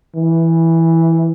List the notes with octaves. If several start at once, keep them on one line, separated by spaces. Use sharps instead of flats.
E3